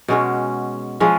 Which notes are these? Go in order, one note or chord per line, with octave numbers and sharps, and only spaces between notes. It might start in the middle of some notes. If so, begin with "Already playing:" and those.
B2 G#3 C#4 F#4
F3 G#3 C#4